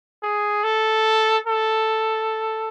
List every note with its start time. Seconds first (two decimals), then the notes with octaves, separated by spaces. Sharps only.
0.23 G#4
0.64 A4
1.47 A4